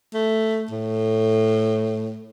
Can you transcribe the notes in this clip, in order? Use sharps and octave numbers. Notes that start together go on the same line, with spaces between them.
A3
A2